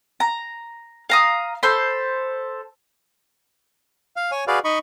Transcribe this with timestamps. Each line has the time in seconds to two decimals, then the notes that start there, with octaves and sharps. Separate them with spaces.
0.20 A#5
1.10 F5 A#5 D#6
1.63 A4 C5 B5
4.16 F5
4.32 C#5 G#5
4.48 F#4 G#4 B4 D5 F5
4.64 D#4 D#5 B5 C#6